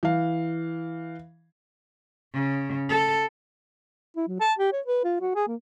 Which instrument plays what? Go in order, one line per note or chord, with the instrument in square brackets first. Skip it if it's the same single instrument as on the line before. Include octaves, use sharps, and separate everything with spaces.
[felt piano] E3 F5
[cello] C#3
A4
[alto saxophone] E4
F#3
A5
G4
C#5
B4
F4
F#4
G#4
A#3